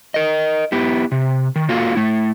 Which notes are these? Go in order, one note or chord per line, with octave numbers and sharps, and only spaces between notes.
A#4 D#5
B3 E4 G4
C3
D#3
A#3 F4 F#4 A4 F5
A3 E4